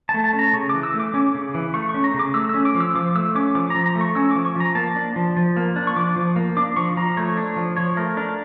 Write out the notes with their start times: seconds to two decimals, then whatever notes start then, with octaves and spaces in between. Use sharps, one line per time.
0.09 A5
0.14 A3
0.24 A5
0.33 C#4
0.39 A#5
0.53 C#3 C#6
0.69 E3 D6
0.83 E6
0.94 A3
1.00 D6
1.14 C#4 D6
1.35 C#3
1.54 E3
1.74 A3 C#6
1.89 C#6
1.94 C#4
2.04 A#5
2.14 C#3
2.19 D6
2.34 A3 E6
2.49 E6
2.54 C#4
2.65 D6
2.75 F3
2.80 E6
2.95 F3 D6
3.15 A3 E6
3.35 C#4 D6
3.55 F3 D6
3.70 F3 A#5
3.86 A#5
3.95 A3
4.01 C#6
4.15 C#4 E6
4.31 F3 D6
4.45 C#6
4.56 F3 A#5
4.75 A#3 A5
4.96 D4
5.16 F3
5.37 F3
5.57 A#3
5.76 D4
5.87 C#6
5.96 F3 D6
6.16 F3
6.36 A#3
6.57 D4 D6
6.76 F3 C#6
6.97 F3 A#5
7.17 A3 C#5
7.37 D4
7.56 F3
7.77 F3 C#5
7.97 A3 A#4
8.17 D4 A#4